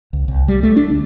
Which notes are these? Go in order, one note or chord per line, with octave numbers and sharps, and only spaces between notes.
C#2
C2
G3
A3
D4
D2